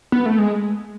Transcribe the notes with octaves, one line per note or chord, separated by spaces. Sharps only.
B3
A3
G#3